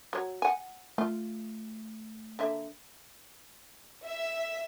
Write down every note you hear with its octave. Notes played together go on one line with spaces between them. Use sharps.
F#3 C#5
F#5 G#5
A3 F4
D3 A#3 E5
E5